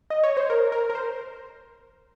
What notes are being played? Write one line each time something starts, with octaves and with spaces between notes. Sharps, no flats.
D#5
C#5
C5
A#4
A#4
A#4
C5